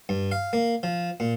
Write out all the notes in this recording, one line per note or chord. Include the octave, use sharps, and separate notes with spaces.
G2
F5
A#3
F3
A#2